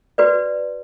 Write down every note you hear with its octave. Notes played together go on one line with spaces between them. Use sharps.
F#4 B4 D5